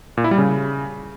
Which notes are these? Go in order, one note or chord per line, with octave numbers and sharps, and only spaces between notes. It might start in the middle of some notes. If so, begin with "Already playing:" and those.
A#2
E4
G3
C#3